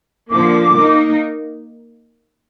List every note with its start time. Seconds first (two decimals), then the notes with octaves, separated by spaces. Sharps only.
0.30 D3 F3 A#3 D6
0.75 A#3 D#4 A#4